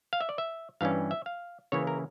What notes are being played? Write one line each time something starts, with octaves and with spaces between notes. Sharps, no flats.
F5
E5
D5
E5
G2 E3 G3 C#4 F5
E5
F5
C#3 E3 A#3 C#4 E4 C#5
A#4